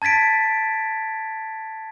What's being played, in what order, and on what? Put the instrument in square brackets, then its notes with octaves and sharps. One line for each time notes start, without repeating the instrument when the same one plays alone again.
[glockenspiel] A5 G#6 A6 B6 D7